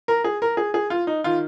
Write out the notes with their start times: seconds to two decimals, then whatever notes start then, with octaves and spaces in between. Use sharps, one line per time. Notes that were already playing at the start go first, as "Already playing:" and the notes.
0.08 A#4
0.24 G#4
0.42 A#4
0.57 G#4
0.74 G#4
0.90 F4
1.07 D#4
1.24 D#3 F4